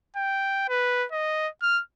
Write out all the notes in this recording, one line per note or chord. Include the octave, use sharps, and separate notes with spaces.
G5
B4
D#5
F6